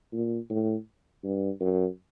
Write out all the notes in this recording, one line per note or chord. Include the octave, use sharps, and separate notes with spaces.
A#2
A2
G2
F#2